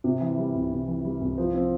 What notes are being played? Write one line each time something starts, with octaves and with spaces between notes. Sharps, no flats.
C3
E3
G3
C2
C3
E3
G3
C2
F3
C4